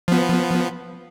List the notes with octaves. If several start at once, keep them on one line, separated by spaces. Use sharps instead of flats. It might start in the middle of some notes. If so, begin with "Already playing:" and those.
F3 B3